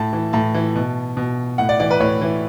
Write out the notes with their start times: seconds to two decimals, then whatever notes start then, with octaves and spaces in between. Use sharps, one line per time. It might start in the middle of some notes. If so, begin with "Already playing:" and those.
Already playing: A2 A5
0.13 E3
0.33 A2 A5
0.54 E3
0.76 B2
1.17 B2
1.58 A2 F#5
1.69 D5
1.80 E3 D5
1.91 B4
2.00 A2 C#5
2.21 E3